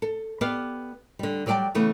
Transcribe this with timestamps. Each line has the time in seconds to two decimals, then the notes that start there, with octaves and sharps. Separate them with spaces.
0.02 A4
0.41 B3 G4 D5 F5
1.19 D3 G3
1.46 F#3 G3 D5 E5 G5 A5
1.75 C#3 E3 A3 B3